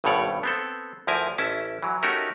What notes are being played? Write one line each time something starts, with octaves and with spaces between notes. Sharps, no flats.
G#1 G2 B2 A3 C#5 D5
B3 C4 A4
D2 F3 E4 A#4 G#5
A1 C#4 E4 A5
E3 F#3
A3 C#4 D#4 F#4 G4 A#4